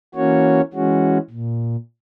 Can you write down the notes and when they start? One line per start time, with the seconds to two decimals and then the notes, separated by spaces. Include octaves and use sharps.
0.15 E3 A#3 C#4 F#4 C#5
0.73 E3 G#3 C#4 F#4
1.31 A#2